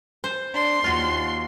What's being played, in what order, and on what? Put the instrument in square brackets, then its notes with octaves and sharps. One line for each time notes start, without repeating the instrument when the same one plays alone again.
[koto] C5
[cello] D4 [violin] C6
[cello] D#2 A#3 [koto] F4 F#4